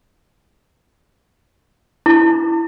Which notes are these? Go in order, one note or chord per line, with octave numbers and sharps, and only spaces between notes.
E4